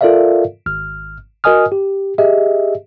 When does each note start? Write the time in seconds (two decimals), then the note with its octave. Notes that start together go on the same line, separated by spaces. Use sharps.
0.01 F4 A4 A#4 D5 E5 F5
0.66 G#1 F6
1.44 F#4 A#4 D#5 G#5 D#6 F6
1.72 G4
2.18 G4 G#4 D#5 E5